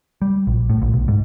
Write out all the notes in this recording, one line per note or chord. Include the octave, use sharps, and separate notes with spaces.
G3
A#1
A2
A#1
B1
G#2